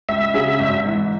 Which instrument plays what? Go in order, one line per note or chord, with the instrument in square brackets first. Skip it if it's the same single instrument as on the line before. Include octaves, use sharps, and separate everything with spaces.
[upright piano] C#2 [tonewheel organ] E5
[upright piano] C#3 F#3 C#4 G#4
G#1
G#2 E3